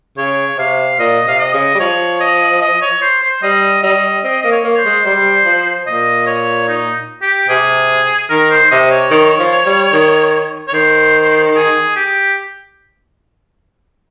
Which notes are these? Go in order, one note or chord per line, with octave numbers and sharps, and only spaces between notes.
C#3 C#5
C3 F5
A#2 D#5
C3 F5
D#5
C#3
G3
F3 C#5
D#5
D#5
C#5
C5
C5
G3 D#5
G3 D#5
C4 D#5
A#3 D#5
C#5
A#3
C5
G#3
G3 C5
F3
A#2 D#5
C#5
D#4
G4
C3 G#4
D#3 A#4
C5
C3 D#5
C#5
D#3
F3
G3
D#3
C#5
D#3 C5
G#4
G4